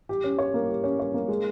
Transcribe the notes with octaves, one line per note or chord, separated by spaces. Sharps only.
G4
C#4
C#5
A#3
G4
C#4
C#5
A#3
G#3